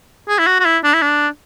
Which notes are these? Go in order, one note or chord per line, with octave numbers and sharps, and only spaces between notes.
G#4
E4
F#4
F#4
E4
D4
E4
D4